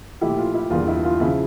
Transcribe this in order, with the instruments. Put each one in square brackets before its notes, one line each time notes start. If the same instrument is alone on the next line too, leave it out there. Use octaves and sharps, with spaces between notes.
[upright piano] A#2 F3 A3 E4 G4
F4
E4
E2 D3 G3 A#3 F4
E4
F4
C#3 F3 E4